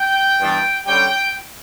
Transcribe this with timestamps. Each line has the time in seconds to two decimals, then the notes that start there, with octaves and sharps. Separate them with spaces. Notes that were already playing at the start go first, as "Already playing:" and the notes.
Already playing: G5
0.39 G2 E3 B3 D4
0.86 D3 G3 C#4 G5